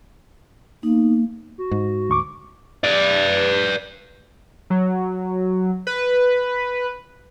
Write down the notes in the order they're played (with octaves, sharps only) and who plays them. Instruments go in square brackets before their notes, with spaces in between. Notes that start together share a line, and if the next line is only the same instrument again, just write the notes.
[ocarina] A#3 [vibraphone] B3 D#4
[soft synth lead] F#4
[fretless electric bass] G#2
[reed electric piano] D2 C#6 D6
[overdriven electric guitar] B4 D5
[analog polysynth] F#3
B4